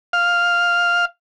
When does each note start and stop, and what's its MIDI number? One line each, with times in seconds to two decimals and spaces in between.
0.13 1.05 77